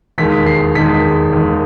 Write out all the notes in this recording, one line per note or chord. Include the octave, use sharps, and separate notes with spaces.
E1 D#2 D#3 G#3 B6
C7
E1 D#2 D#3 G#3 B6
E1 D#2 D#3 G#3